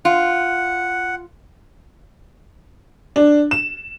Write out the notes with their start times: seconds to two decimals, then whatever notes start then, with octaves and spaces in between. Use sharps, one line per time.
0.05 F4 F#5
3.16 D4
3.51 E7